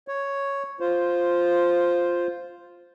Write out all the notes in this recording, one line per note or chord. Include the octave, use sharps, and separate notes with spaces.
C#5
F4 C5